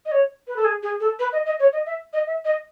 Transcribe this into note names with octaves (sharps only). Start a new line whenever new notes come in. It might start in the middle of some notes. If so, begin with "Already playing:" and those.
D#5
C#5
B4
A4
G#4
G#4
A4
B4
D#5
D#5
C#5
D#5
E5
D#5
E5
D#5